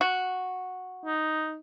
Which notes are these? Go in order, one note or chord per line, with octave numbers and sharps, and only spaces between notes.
F#4
D#4